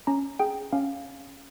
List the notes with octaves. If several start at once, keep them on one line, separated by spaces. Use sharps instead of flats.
C#4 A#5
G#4 G5
C#4 F5